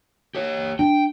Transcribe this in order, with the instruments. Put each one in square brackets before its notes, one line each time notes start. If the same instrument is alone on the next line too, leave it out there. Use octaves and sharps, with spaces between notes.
[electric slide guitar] G4 C#5
[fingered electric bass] D4 [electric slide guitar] G5